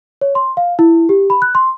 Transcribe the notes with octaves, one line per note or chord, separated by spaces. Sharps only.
C#5
C6
F5
E4
G4
B5
F#6
C6